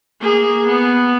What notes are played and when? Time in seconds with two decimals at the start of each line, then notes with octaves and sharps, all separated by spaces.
0.21 A#3 G#4
0.67 B3